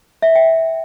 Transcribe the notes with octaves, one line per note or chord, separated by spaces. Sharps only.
E5
G5